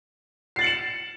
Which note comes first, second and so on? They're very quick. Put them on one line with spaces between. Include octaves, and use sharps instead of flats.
C7 A6 F#7 C#7 E7